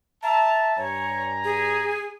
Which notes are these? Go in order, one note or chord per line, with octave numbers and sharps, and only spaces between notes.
E5 A5 A#5
G2 C#5 G#5 A#5
G#4